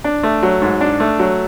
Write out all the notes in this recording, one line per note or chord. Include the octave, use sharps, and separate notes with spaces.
D4
A3
F#3
G#2
D4
A3
F#3